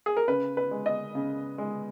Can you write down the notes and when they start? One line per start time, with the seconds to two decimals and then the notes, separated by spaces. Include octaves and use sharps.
0.06 G#4
0.17 A#4
0.28 C#3 B4
0.57 B4
0.71 G#3
0.86 D#5
1.15 C#3
1.58 G#3